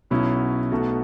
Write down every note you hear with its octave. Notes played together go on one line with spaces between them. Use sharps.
B1 B2 F#3 C#4 E4
B1 B2 A3 F#4